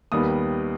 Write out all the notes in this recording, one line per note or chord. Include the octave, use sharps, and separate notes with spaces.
D#2 D#3 G3 B3 D#6